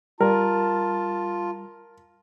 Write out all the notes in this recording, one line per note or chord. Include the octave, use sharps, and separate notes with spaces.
G3 F4 A#4 A5